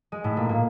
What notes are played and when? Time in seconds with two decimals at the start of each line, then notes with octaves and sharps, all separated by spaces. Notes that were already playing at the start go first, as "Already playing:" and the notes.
0.12 G#3
0.24 A2 A3
0.36 A#2 A#3
0.49 A#2 A#3